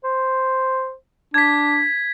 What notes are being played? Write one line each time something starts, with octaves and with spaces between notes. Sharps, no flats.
C5
D4 G#6 B6